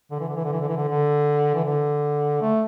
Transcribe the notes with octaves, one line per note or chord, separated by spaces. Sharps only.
D3
E3
D3
E3
D3
E3
D3
E3
D3
D3
E3
D3
A3